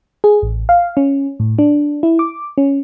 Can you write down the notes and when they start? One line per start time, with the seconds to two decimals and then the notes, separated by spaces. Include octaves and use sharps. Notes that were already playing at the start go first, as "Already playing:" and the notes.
0.24 G#4
0.42 A1
0.69 F5
0.97 C#4
1.40 A2
1.59 D4
2.03 E4
2.19 D6
2.58 C#4